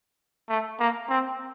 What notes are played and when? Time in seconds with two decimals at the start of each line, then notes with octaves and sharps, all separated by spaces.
0.49 A3
0.80 A#3
1.09 C4